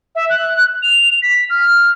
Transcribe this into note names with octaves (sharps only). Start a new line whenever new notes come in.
E5
F#6
F7
B6
F6